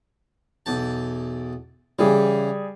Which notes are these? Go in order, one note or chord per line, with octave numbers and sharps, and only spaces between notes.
B1 E2 A5
C#3 E3 G3 G#4